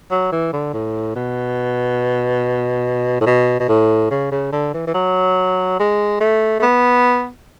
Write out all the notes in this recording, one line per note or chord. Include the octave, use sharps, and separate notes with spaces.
F#3
E3
D3
A2
B2
A2
B2
B2
A2
C#3
C#3
D3
E3
E3
F#3
G#3
A3
A3
B3